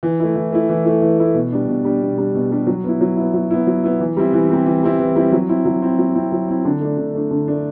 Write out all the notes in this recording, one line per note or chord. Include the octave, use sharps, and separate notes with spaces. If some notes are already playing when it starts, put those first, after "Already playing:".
E3
A3 E4
E3
A3 E4
E3
A3 E4
E3
A3 E4
B2
G3 D4
B2
G3 D4
B2
G3 D4
B2
G3 D4
F#3
B3 E4
F#3
B3 E4
F#3
B3 E4
F#3
B3 E4
E3
G3 C4 E4
E3
G3 C4 E4
E3
G3 C4 E4
E3
G3 C4 E4
F#3
C4 E4
F#3
C4 E4
F#3
C4 E4
F#3
C4 E4
D3
A3 D4
D3
A3 D4
D3
A3 D4